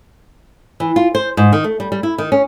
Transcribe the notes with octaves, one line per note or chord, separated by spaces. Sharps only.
E3
F4
C5
G#2
D#3
A3
G3
G3
E4
D#3
C#4